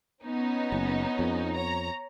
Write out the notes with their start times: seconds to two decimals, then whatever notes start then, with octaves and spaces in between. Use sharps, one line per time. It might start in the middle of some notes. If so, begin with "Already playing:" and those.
0.24 B3 C#4 D#4
0.72 F#1
1.19 F2
1.56 C#5 A#5